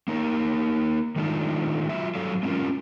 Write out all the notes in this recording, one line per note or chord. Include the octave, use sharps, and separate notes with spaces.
A#3 D#4 A#4 C#5
D#3 G#3 A3 D4 D#4 F4
F#3 F4 E5
G2 F#3 A4 C#5 F5
G#3 C4 C#4 F4 A#4